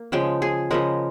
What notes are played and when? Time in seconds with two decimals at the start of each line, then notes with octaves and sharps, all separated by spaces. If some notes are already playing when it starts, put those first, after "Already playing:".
Already playing: A#3
0.12 C#3 F3 G#3 G5
0.42 G#4
0.71 C#3 F3 G#3 A#4